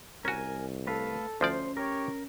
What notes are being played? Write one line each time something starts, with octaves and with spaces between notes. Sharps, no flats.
C2 C#4 F#4 A#4 G#5
A3 A4 B4 F5
D2 F3 C#4 C5 D5
G4 A#4 C#5